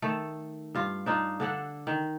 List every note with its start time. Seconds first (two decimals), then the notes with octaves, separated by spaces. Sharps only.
0.02 D#3 A3 A4
0.75 G2 F4
1.06 D4 D#4 F4
1.40 D3 D4 A4 F#5
1.87 D#3